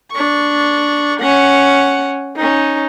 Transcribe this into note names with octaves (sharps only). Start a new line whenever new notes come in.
D4 C#6
C#4 F#5
C#4 D#4